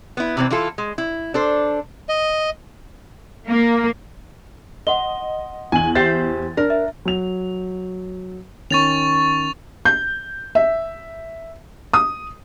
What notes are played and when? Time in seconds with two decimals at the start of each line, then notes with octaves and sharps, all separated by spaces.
0.17 B3 E4
0.37 C3 E3 C4
0.50 E3 E4 F4 A4
0.78 G#3
0.98 E4
1.34 D4 A4 C5
2.09 D#5
3.48 A#3
4.87 D#5 F#5 C6 G7
5.72 E2 G#5 F#7
5.95 G4 C5 E5 A6
6.57 D4 A#4
6.70 E5
7.05 F#3 F7
8.71 D#3 C#4 C#6 A6 F7
9.85 G6
10.55 E5
11.93 D#6